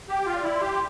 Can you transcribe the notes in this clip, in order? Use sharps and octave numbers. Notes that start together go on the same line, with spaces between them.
G4 G5
F4
D5
E4
C6
G4